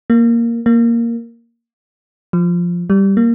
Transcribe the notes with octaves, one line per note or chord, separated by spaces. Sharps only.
A#3
A#3
F3
G3
A#3